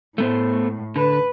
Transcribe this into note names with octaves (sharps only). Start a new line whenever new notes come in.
A2 A3 B3 C5
D3 B4